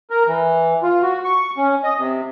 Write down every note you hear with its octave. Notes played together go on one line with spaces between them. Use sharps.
A#4
E3
F4
F#4
C#6
C#4
D#5
C3